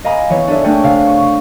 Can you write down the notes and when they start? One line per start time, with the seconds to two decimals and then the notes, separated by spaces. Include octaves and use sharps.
0.04 D#5 F5 G#5 A#5 B5 D6
0.30 E3 B3 C#5
0.47 D4 G#4 A4 D5 E5
0.64 A3 A#3 D4 G#4 C#5 G5
0.83 C3 F5
1.07 C#6